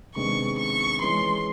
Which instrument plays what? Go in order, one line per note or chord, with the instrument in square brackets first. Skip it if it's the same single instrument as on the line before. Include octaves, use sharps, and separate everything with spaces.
[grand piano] C3 D#3 G#3 B3 D4 [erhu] C#6
[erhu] C#6
[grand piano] E3 G#3 C#4 [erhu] C6